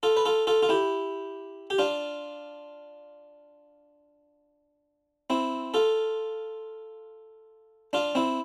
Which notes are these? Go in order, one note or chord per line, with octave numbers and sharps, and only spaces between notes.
F4 A4
B4
F4 A4
F4 A4
F4
E4 G4
G4
D4 F4
C4 E4
F4 A4
D4 F4
C4 E4